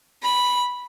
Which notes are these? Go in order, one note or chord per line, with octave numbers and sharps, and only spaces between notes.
B5